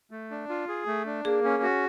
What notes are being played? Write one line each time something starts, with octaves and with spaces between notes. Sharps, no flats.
A3
D4
F4
G#4
A3
D4
A#3 G#4
C#4
F#4